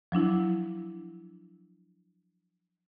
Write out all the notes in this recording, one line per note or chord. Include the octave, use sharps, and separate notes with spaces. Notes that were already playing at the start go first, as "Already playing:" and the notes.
F3 F#3 D4 E4